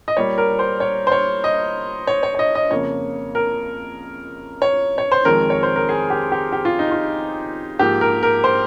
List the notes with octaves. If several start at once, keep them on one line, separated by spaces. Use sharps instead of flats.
D#5
A#2 G3 A#3 C#5
A#4
C5
C#5
C5
C#5
D#5
C#5
C#5
C#5
D#5
D#5
F2 C#3 F3 A#3 C#5
A#4
C#5
C#5
C5
F2 D#3 G#3 A#4
C#5
C5
A#4
G#4
G4
G4
G4
F4
D#4
F4
G#2 F3 A#3 G4
A#4
A#4
C5